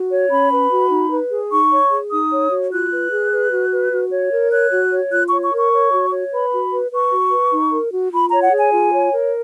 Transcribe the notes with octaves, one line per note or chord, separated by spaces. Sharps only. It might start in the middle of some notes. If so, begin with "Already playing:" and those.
Already playing: F#4
C#5
C#4 B5
B4
F#4
D#4
B4
G#4
D#4 C#6
C#5
G#4
D#4 D#6
C#5
F#4
F4 F#6
B4
G#4
B4
F#4
B4
F#4
C#5
A#4
C#5 F#6
F#4
C#5
F4 F#6
C#6
C#5
C#6
A#4 C#6
C#5
F#4
C#5
B4 B5
F#4
B4
B4 C#6
F#4
B4
D#4
A#4
F#4
F4 B5
A#5
C#5
F#5
G#4
G#5
F4
C#5
A#4